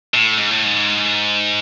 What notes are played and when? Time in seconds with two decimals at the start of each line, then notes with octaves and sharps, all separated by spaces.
0.14 A2
0.37 G#2
0.51 A2
0.65 G#2